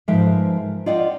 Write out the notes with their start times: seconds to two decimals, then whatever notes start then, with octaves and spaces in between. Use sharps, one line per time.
0.08 G#2 F3 A#4 B4 E5
0.86 F4 C5 D5 D#5 F#5 G5